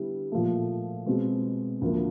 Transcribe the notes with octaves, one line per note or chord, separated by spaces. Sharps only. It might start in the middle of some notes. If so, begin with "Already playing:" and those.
Already playing: D3 G3 B3 E4
A#2 F3 A3
B2 G#3 C4
D2 D3 F3 A#3